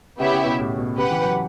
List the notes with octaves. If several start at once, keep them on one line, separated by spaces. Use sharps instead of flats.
C#3 B3 E4 G4 C#5 E5
C#3
B2
A2
B2
C#3 G4 B4 F#5
E3
F#3